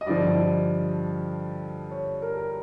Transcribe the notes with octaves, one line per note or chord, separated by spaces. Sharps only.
D#5
G2 D3 F3 D5
C#5
A#4
A#4